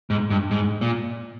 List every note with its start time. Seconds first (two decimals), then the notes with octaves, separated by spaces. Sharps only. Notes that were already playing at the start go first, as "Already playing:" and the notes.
0.10 G#2
0.30 G2
0.51 G#2
0.81 A#2